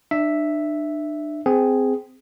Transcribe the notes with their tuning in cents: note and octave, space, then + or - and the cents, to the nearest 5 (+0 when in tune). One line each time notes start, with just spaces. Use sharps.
D4 +35 E5 +0
C4 -20 G#4 +0